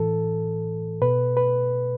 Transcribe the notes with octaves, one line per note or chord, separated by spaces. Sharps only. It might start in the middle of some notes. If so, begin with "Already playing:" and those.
Already playing: A2 E3 A4
B2 B4
B4